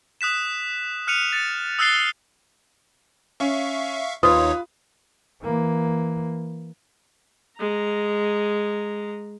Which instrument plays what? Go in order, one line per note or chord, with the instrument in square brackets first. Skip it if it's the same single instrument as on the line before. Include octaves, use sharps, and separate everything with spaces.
[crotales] D#6 F#6 B6 E7
F6 F#6 C#7 D#7 F7
A6 C#7
D#6 E6 F#6 A6 C7 G7
[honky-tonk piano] C#4 [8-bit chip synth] E5 F5 C#6
[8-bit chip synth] D#2 D#4 C#5 [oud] F4 [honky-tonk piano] B4 [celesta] D#6
[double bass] E3 A#3
[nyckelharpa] G#3 A#5